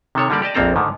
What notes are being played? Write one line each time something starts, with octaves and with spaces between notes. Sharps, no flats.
C3 D#3 A4 C#5
D3 G3 A#3 G4 D5
G4 D5 D#5 A5
A#1 F2 A#3 C4 A4 A#5
G#2 D3 D#3